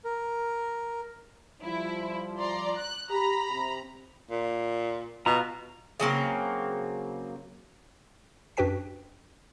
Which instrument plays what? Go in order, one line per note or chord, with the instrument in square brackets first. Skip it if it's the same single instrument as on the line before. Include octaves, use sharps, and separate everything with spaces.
[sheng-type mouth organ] A#4
[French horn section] F3 G3 [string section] E4
[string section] D5 A#5 C6
F#6
[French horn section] G4 [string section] A#5 B5
[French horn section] C3 C4
[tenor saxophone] A#2
[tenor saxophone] B2 [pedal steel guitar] F4 A#5
[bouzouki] C#3 F#3 A#3 C4
[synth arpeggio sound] F#2 D4 F#4 B4 G5 B6